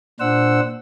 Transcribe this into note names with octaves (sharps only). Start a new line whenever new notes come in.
A#2 D4 C5 F#5 E6